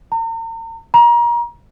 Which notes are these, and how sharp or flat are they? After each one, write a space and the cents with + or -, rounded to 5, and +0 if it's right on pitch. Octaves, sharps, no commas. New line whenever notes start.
A#5 -40
A#5 +30